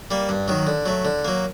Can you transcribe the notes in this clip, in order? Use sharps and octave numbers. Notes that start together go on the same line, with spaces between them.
G3 A#3
G2
D#3 F#3
D3
F#3 A3
D3
F#3 A#3